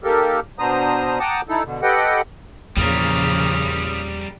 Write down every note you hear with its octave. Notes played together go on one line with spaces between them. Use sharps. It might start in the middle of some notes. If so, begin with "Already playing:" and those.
D#3 A#3 G4 A4 A#4
B2 B3 D4 C5 A#5 D#6
F#5 G5 A5 A#5 D6 D#6
D#4 E4 A4
B2 D3
G4 A4 B4 D#5 F#5 G5
E2 A#2 C#3 F3 G3 A#4 D#6 F6